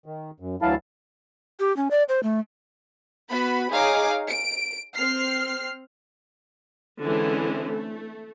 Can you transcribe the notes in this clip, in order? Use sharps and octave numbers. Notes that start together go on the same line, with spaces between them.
D#3
F#2
D2 E3 F#3 E4 F5 A5
G4
C#4
D5
C5
A3
B3 F#4 B4 B5
D#4 G#4 C#5 F5 A#5 D6
D7
C4 F6 C7
D3 E3 G#3 C4 C#4 E4
A3